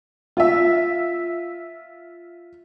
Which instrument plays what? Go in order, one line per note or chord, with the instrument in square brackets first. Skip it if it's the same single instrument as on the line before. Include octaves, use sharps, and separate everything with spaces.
[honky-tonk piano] F4 E5